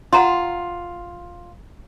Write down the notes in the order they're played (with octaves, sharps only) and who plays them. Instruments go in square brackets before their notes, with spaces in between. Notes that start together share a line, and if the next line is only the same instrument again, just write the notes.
[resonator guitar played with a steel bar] F4 [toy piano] F#5 A#5 C6